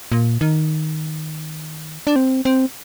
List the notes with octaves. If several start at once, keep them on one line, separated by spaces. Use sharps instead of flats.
A#2
D#3
D4
C4
C4